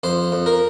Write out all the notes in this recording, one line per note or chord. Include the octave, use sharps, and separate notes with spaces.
F2 C5
F2
A#4